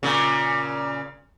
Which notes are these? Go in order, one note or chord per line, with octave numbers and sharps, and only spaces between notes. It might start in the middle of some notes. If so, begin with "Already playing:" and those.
A#2 C#3